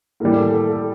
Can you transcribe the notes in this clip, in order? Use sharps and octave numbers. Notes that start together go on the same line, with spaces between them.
A2 E3 G3 A#4
A4
A4
A4